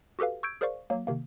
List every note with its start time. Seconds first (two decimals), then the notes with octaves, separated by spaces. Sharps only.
0.19 F#4 G4 A4 B4 F5
0.43 C#6 E6 G6 G#6 D7
0.61 G#4 A#4 C5 D5 F5 C#6
0.90 F#3 A#3
1.07 C3 D#3 A#3